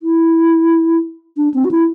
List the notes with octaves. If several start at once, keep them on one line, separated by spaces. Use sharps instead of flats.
E4
D4
C4
F#4
E4